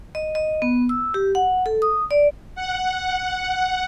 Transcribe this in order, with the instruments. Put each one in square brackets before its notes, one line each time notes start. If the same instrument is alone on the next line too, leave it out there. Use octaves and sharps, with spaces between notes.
[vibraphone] D#5
D#5
B3
E6
G4
F#5
A4
D#6
D5
[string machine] F#5